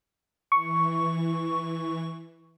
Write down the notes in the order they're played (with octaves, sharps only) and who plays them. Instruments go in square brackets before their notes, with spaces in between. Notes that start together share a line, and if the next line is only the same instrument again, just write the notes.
[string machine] E3 [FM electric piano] C#6